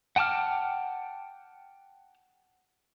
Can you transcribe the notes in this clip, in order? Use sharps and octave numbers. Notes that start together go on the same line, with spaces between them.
F#5 G5 A5 D6 F6